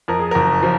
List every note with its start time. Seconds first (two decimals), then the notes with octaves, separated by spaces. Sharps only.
0.08 F2 A#4
0.19 G#4
0.31 F#1 A#4
0.63 F3